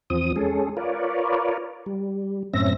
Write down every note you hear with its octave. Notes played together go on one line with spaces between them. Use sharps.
E2 F3 C4 D#6
G#3 C#4 G#4 A4
F4 A#4 B4 C#5 D5
G3
F#2 A2 C4 C#4 E5 A#6